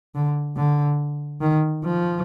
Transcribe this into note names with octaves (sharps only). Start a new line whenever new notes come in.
D3
D3
D#3
F3